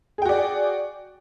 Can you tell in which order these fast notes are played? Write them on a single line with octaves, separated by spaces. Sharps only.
G#4 G5 F#4 D5